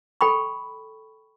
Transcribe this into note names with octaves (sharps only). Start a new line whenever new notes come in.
A4 G5 B5 C#6